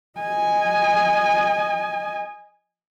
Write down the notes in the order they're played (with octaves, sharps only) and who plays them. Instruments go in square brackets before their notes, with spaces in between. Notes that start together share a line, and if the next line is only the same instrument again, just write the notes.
[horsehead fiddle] D#5 G#5